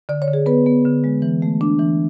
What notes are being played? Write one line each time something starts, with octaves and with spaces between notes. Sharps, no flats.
D3 D5
C#5
D3
G#4
B3 B4
B3
D3
G#3
E3
A3
D4
E3